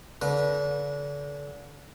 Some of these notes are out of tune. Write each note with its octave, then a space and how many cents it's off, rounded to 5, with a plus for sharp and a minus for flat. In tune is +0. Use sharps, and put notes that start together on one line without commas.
D3 -35 B4 -30